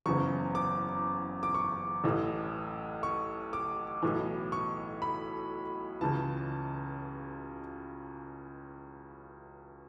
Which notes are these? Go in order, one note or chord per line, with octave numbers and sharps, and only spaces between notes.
F#1 E2 C#3 E3 C#6
D6
D6
C#6
A1 A2 E3
C#6
D6
B1 A2 E3
C#6
B5
C#2 C#3 E3 A5